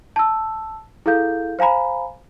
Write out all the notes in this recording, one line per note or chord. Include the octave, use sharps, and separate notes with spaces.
A5 E6
E4 G#4 A4 F5 G6
C5 F5 G#5 A#5 B5